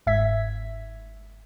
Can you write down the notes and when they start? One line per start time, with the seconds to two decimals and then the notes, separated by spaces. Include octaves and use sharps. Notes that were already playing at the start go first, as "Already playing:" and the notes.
0.07 G1 G#2 E5 G#6 B6